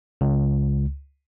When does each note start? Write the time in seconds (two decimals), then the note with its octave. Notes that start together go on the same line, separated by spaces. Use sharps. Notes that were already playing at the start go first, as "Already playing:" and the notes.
0.21 C#2